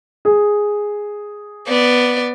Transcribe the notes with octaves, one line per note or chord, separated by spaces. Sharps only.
G#4
B3 D5